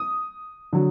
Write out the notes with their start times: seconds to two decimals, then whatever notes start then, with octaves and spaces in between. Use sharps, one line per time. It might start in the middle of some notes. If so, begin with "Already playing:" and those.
Already playing: D#6
0.73 D3 F#3